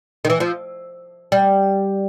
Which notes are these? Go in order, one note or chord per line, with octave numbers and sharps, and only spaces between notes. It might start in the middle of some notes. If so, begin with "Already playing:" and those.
D#3
E3
F3
G3